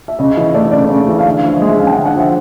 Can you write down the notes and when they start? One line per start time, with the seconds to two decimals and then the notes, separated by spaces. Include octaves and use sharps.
0.08 E5
0.19 C#3 D#5
0.36 E3 D#5
0.54 A3 D5
0.63 D#5
0.71 C#3 D5
0.89 C#3
1.08 E3
1.19 F5
1.25 D3 E5
1.44 F3
1.56 D#5
1.62 G#3
1.67 E5
1.79 C#4 F5
1.87 G5
1.92 D3 F#5
2.06 F#5
2.15 F3 E5